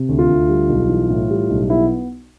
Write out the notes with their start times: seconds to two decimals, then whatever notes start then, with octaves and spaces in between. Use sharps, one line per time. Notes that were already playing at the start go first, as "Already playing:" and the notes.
Already playing: C3
0.09 D2
0.19 F4
0.29 D2
0.49 G3
0.69 B1
0.89 E3
1.10 A2
1.30 G3
1.50 B1
1.70 B3 E4